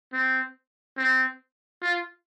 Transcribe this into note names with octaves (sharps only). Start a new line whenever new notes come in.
C4
C4
F4